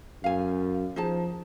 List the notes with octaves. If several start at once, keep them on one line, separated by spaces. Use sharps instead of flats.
F#2 F5 G#5
F3 D#4 G#4 A5